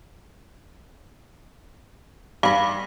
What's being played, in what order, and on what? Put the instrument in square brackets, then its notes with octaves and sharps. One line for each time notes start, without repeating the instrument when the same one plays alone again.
[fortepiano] G2 B5 [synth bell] F5